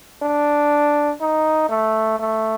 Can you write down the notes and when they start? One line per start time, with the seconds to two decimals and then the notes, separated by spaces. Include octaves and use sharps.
0.22 D4
1.21 D#4
1.70 A3
2.19 A3